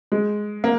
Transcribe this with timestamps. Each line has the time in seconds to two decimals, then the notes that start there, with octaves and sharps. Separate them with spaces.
0.12 G#3
0.64 A#3